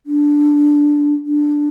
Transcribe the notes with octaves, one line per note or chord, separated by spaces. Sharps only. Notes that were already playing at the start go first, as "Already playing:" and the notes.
D4
D4